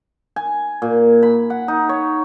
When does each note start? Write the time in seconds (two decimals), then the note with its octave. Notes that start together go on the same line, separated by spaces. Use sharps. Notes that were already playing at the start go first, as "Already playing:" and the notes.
0.36 G#5
0.82 A#2
1.23 B5
1.50 F#5
1.68 D#4
1.89 C#5